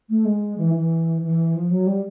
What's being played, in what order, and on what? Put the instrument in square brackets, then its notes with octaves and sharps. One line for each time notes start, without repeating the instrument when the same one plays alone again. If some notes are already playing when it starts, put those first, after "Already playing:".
[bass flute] A3
G#3
E3
E3
E3
F3
F#3
G3